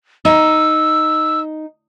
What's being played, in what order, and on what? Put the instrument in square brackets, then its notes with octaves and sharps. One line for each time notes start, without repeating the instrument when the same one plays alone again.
[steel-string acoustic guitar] D#4 [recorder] E6